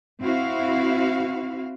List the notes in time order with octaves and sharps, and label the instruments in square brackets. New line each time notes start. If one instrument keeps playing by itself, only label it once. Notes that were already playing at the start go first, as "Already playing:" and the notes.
[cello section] C4 E4 F#4 F5